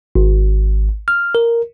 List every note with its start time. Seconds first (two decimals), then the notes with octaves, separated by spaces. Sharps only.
0.16 G#1
1.08 F6
1.35 A#4